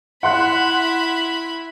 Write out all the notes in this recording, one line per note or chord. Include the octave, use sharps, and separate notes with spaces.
E4 F#5 B5 C6 F#6